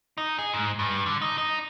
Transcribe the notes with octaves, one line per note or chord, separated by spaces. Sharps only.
D#4
G#4
G#2
G2
D3
D#4
D#4